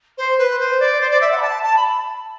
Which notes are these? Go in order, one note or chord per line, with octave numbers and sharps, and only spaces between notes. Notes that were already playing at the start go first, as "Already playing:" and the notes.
C5
B4
C5
D5
C5
D5
E5
F#5
B5
A5
A5
B5